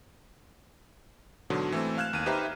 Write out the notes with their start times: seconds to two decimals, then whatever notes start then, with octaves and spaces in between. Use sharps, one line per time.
1.50 G#2 B2 D3 F#3
1.72 E3 A3 C4
1.98 F5 F6 F#6 G#6 E7
2.13 D#2 D#7
2.26 D#4 G4 B4 C5 E5 A#5